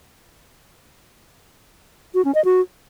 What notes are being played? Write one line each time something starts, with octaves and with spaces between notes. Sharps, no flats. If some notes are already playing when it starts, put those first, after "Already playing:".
F#4
C#4
D#5
F#4